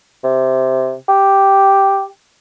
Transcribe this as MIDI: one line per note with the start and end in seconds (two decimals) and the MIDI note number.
0.24 0.94 48
1.09 2.05 67